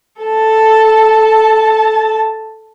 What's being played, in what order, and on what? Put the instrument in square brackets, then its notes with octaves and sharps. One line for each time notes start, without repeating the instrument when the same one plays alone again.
[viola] A4 A5